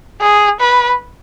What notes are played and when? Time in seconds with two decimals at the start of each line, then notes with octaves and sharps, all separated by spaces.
0.21 G#4
0.60 B4